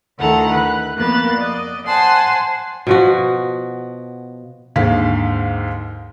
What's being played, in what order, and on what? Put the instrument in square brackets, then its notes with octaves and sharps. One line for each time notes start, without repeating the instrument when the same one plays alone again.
[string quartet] D2 D#3 E4 A4 F#5 A#5
B4 F#6
F2 A#3 B3 F#6 A6
D5 D#5
C5 F#5 G#5 A5 C6
[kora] B2 F3 F#4
[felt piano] D#2 G#2 D3 F5 B6